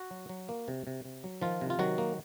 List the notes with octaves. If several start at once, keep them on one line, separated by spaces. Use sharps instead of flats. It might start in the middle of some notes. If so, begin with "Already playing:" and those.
Already playing: F#4
F#3
F#3
A#3
C3
C3
C3
F#3
D#3 F3 F4
C3
F4
D#3 F#3 F#4
A#3